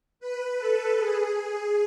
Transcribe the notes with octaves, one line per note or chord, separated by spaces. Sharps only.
B4
A4
G#4